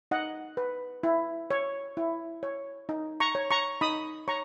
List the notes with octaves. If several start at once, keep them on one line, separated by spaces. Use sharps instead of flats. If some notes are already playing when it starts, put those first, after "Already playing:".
D#4 D#5 F#5
B4
E4
C#5
E4
C#5
D#4
A#5 C#6
C#5
A#5 C#6
D#4 B5 D#6
C#5 A#5 C#6